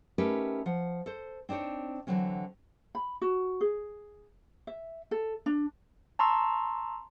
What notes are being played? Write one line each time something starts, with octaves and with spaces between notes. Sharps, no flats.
A3 C#4 D#4 G4 A#4 B4
F3 F#5
A4 C5
C4 D4 D#4 C5 C#5
D3 E3 F#3 C4 C#4
B5
F#4
G#4
E5
A4
D4
A5 A#5 C6 C#6 E6